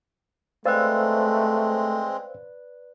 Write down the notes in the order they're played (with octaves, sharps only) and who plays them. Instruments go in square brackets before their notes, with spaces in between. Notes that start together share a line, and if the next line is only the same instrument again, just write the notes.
[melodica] G#3 C4 [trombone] A3 [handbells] B4 D5 [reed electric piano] C5 F5 E6